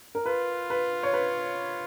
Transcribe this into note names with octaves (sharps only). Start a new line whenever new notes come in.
A#4
F4 B4
B4
C#5
B4